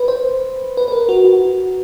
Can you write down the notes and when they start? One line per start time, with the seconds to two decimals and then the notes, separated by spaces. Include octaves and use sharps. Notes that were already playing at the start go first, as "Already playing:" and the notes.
Already playing: B4
0.08 C5
0.77 B4
0.88 B4
0.92 A#4
1.09 F#4
1.24 F#4